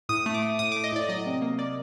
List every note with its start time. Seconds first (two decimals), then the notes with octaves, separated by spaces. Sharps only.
0.09 A2 D#6
0.26 A3
0.34 D6
0.42 A3
0.59 A2 D#6
0.72 A3 D6
0.84 D#5
0.92 A2 D5
1.09 F#3 D#5
1.26 C3
1.42 A#3
1.58 A#3 D5